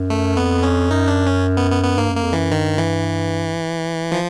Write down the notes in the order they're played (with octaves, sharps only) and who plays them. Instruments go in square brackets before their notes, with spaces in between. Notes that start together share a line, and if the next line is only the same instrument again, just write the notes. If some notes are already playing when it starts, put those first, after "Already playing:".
Already playing: [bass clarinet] F#2
[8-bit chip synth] A3
[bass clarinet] F2 [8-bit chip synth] B3
[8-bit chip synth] C#4
[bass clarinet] F#2 [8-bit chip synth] D#4
[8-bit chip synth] D4
C#4
B3
B3
B3
[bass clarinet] G2 [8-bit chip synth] A#3
[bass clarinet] F#2
[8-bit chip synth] A#3
[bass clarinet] F2
[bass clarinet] F#2 [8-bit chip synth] E3
[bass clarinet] G2 [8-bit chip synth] D#3
[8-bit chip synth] E3
F3